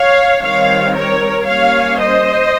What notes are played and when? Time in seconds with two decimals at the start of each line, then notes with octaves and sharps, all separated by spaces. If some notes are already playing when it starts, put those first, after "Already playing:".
Already playing: C#5 F5
0.42 D#3 G3 C4 C#5 F5
0.95 A#4 C#5
1.46 G3 A#3 C#4 C#5 F5
1.99 C5 D#5